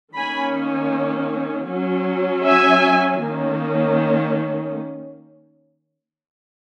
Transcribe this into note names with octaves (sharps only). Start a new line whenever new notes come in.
D#3 A#3 C#4 G#5 B5
F#3 C#4
E5 G#5
D#3 A#3 C#4